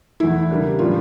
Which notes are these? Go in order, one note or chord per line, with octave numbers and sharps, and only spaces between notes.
E2 E3 A3 E4
C#3 G3 A#3 D4
A2 E3 G3 D4 F4